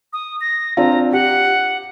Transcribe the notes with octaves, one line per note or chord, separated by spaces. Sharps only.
D#6
A#6
C4 D4 F4 A#5
G4 F#5